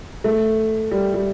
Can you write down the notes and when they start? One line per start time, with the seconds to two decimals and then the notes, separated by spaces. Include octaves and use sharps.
0.24 A3
0.91 G3
1.14 G3